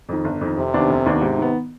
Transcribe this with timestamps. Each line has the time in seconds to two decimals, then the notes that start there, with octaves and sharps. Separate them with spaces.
0.09 F2 D#3
0.24 G1
0.41 F2 D#3
0.57 F1 C3
0.73 D#2 D#3 B3 D4
0.90 F1
1.06 D#2 D#3 B3 D4
1.21 G#2 C3
1.38 D#3 B3